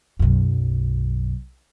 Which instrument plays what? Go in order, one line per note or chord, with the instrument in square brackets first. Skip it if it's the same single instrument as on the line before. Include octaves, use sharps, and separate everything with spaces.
[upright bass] B1 F#2